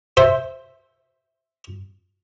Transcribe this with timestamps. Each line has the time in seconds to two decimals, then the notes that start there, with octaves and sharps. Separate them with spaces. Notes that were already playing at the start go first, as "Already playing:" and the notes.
0.17 C5 E5